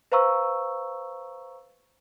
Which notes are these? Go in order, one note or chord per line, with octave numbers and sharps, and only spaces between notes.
B4 C5 F5 A#5 C#6 E6